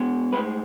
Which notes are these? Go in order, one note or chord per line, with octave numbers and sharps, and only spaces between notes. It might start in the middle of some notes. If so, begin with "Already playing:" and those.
Already playing: B2 G#3
A2 G#3 B4